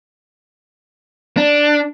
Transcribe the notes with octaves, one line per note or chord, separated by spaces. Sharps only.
D4